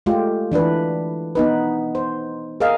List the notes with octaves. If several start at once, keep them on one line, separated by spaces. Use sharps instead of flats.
G#3 A3 F4 G4
E3 D4 E4 B4
B3 D#4 B4
C5
G#4 A#4 D#5 F5